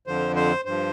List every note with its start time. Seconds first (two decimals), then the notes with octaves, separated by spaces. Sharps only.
0.07 F2 D3 F3 C5
0.36 C5
0.65 G2 F3 C5